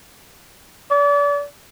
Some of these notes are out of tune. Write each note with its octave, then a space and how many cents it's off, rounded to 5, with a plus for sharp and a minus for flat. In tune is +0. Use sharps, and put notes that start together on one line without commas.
D5 -35